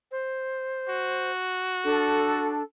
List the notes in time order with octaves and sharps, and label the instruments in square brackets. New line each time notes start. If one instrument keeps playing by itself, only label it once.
[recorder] C5
[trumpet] F#4
[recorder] D4 [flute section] A4